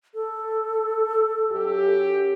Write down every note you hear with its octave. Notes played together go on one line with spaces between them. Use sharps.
A4
F#2 G4